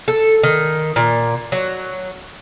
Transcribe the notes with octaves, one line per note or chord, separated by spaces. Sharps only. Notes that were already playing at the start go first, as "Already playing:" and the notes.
A4
D#3
A#2
F#3